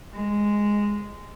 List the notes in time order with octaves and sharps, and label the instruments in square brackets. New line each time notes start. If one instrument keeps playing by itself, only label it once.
[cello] G#3